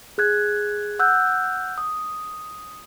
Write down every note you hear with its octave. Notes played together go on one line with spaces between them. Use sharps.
G#4 F#6 G#6
F#5 E6 F#6 G6
D#6